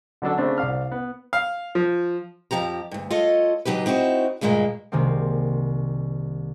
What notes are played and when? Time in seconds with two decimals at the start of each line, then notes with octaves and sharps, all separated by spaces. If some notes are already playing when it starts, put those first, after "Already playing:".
0.22 D3 F#3 D4 A4
0.38 C#3 A3 C4 D4
0.58 C2 D5 F5 F6
0.91 B3
1.33 F5
1.75 F3
2.51 F2 G#2 F3 G4 A#5
2.91 D2 G2
3.10 F4 A4 C#5 D#5
3.65 C#3 F#3 D#4 G4 B4
3.86 C4 D#4 E4 F#4
4.41 D2 G2 A#2 G#3 A#3
4.92 C2 C3 D#3 G#3 A#3 C4